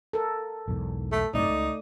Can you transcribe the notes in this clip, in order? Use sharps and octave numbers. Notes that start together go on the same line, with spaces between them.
A4 A#4
B1 E2 G#2
A3
F#2 A2 C3 A3 D#4 D5
C#2